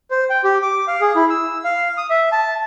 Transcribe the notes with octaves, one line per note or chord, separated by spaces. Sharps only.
C5
G5
G4
D6
F5
G#4
E4
E6
F5
D#6
E5
A5